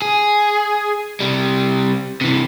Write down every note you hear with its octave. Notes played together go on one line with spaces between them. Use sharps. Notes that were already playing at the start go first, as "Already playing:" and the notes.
G#4
C3 G3
C3 E3